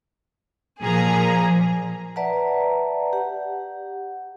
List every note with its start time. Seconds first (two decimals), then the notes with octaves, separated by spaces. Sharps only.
0.83 A#2 F3 G#4 A#5
2.16 B4 D5 E5 F#5 A5 A#5
3.13 G4 F#5